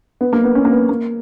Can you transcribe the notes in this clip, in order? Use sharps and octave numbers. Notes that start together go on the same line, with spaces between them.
B3
A#3
B3
C#4
A#3
B3
A#3